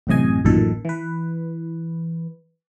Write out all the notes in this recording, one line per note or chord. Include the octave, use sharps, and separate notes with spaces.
A1 F#2 A2 C3 D#5 G#5
A1 F#2 A#2 D#3 A4
E3 B4